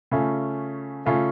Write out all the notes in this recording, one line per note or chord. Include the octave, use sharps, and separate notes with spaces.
C#3 A3 C#4 F4
C#3 A3 C#4 F4